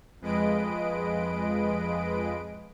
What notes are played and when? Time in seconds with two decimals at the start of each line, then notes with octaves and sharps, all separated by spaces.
0.21 F2 G#3 B4 D#5 D7